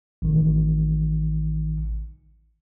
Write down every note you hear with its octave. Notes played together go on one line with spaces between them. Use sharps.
A1 D#3